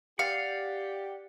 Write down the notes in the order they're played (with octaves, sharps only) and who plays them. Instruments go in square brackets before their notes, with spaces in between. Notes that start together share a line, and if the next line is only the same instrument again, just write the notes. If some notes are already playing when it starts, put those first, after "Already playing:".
[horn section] G4 [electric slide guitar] D5 F#5 [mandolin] F5